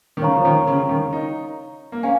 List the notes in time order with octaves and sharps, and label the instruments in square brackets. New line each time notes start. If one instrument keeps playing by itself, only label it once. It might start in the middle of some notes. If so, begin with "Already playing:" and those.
[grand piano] D#3
[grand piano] C#3 [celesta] C#5 F5 A#5 C#6
[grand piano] F3
D#3
C#3
D#3
D#4
A#3
[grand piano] C#4 [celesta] F5 G#5